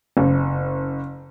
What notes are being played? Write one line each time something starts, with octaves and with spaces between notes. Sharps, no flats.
F#1